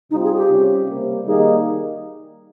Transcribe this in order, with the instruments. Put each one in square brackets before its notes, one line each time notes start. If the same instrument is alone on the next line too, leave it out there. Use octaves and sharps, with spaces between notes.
[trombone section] C3 G3 C4 F4 [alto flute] D#4
[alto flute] G#4
G4
[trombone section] C3 G3 C#4
C3 G3 A#3
[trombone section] D#3 G3 A#3 D#4 [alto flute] G#4